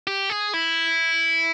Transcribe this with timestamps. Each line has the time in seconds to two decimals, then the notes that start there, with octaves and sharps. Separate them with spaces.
0.07 G4
0.30 G#4
0.54 E4